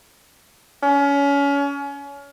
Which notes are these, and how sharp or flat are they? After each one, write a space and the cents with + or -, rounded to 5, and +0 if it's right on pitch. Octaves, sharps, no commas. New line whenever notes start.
C#4 +30